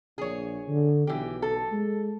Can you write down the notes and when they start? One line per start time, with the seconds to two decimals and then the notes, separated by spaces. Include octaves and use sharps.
0.18 A#1 G#4 C#5
0.68 D3
1.07 B1 E3 G4
1.42 A4
1.72 G#3